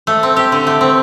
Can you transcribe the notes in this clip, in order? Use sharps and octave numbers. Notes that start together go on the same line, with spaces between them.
A3
C4
G4
D3
A3
C4